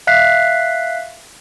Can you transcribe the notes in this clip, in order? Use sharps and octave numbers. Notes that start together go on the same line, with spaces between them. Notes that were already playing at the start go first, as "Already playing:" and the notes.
E5 F5 F#6 B6 C7